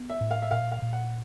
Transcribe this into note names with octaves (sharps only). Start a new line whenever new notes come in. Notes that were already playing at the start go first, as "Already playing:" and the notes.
Already playing: B3
E5
A2
F5
E5
A#2 F5
F5
A#2
F#5